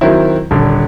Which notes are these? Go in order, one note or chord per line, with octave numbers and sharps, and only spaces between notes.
D#3 F#3 C4 E4
D#1 D3